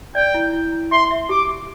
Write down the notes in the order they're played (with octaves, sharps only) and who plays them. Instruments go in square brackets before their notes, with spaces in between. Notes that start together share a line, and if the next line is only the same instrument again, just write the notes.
[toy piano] D5 [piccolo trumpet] G5
[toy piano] E4
E4
E4
[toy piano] E5 [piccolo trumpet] C6
[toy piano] E5
[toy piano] G4 [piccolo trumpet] D6
[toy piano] G4